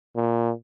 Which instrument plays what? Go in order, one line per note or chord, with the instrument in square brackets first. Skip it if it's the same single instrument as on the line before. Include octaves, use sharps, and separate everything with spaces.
[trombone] A#2